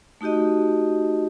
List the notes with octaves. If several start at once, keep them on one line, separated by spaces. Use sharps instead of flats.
A3 D#4 F#4 G4 D#5